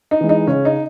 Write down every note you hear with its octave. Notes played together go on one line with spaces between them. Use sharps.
D#4
E3 G#3
D#4
C#3 C#4
D#4